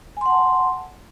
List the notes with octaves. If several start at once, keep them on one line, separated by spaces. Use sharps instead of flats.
F#5 G#5 A5 C6